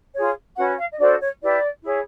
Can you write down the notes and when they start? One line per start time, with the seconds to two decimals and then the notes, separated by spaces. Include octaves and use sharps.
0.15 F4 G#4 C#5
0.57 C#4 F#4 B4 F#5
0.78 F5
0.91 D#5
0.99 D4 F#4 A4 C5 D5
1.21 C#5
1.42 E4 G4 B4 D5
1.84 E4 G#4 C#5